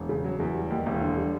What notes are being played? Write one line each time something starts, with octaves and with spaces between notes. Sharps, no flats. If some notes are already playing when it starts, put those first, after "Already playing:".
Already playing: E1
C#3
F#3
E2
G3
D#2
E1
D3
G3